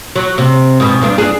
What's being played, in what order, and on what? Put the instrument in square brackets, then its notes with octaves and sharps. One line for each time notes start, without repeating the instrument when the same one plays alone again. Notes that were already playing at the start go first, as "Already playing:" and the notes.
[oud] F#3
C3
G#2 B2
G2 B3 D4
D4 G#4